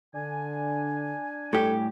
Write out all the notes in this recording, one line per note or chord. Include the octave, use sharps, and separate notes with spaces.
D3 D4 G#5
A2 G3 G4 A4